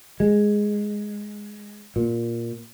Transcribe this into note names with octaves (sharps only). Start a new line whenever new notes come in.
G#3
A#2